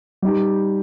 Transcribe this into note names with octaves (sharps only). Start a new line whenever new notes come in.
G3 D#4 G4